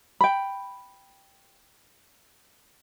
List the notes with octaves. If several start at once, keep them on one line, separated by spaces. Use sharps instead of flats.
G5 B5